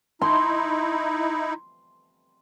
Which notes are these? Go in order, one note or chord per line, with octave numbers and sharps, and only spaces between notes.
D#4 E4 C6